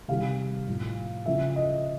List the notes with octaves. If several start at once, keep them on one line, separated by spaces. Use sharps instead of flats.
C3 D#3 G3 F5
A2 F3
C#3 F3 E5
D#5